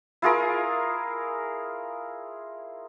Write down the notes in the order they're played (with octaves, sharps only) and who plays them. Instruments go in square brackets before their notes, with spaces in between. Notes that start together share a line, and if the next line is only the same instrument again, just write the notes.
[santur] E4 F4 G#4 A#4